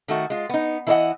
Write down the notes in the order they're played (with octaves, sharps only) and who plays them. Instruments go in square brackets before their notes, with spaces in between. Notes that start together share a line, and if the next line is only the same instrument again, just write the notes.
[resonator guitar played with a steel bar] D#3 A3 F#4
G#3 F4
B3 D#4
E3 E4 A#4 C#5 D#5 F#5